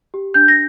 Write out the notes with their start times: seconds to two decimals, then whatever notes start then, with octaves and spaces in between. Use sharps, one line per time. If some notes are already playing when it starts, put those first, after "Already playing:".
0.14 G4
0.34 D4 G6
0.48 A#6